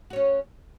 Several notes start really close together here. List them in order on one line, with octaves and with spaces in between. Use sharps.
F#4 C#5 C#4